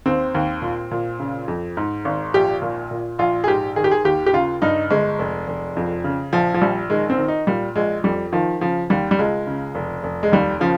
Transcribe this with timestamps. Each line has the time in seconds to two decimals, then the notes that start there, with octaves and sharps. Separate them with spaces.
0.06 D#2 C4
0.35 D#2
0.62 A#2
0.91 A#2
1.20 C#3
1.48 F2
1.77 G#2
2.05 G#1
2.34 A#1 G4
2.62 A#2
2.91 A#2
3.19 A#1 F4
3.44 G#4
3.47 G#2 G4
3.76 D#3 G#4
3.84 G4
3.91 G#4
4.04 D#2 G4
4.26 G4
4.33 C#3 F4
4.62 G2 D#4
4.90 G1 G#3
5.19 F1
5.48 F1
5.77 F2
6.04 C#3
6.33 A#1 F3
6.54 F3
6.61 A#1 G3
6.90 D#3 G#3
7.10 C4
7.18 D#3
7.28 D#4
7.47 A#2 G3
7.76 A#1 G#3
8.04 F2 G3
8.33 D#3 F3
8.61 C#3 F3
8.90 D#2 G3
9.11 G3
9.19 C#2 G#3
9.47 C#3
9.75 F1
10.04 F1
10.23 G#3
10.32 D#2 G3
10.60 C#3 F3